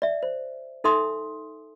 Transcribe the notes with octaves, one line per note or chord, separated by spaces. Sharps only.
D5 E5
C5
D#4 A4 E5 G#5 C6 D#6